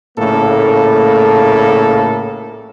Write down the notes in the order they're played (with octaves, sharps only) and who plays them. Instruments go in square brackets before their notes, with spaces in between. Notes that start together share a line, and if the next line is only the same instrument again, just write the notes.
[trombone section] A#1 A2 C#3 A#3 A4